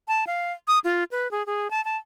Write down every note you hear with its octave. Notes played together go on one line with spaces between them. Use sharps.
A5
F5
D#6
F4
B4
G#4
G#4
A5
A5